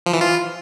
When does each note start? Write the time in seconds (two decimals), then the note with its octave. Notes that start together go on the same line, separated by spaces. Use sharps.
0.06 F3
0.14 E3
0.21 F4